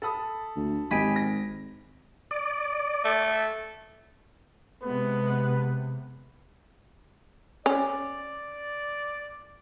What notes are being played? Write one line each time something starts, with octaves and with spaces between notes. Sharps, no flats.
A4 B5 D#6
D2
G#1 G4 D#5 G#5 B5 D7
A#6
D5
A3
C3 G#3 B3 B4
C#4 D5